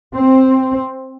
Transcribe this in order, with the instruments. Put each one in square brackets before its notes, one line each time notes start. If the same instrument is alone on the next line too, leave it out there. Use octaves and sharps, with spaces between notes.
[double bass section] C4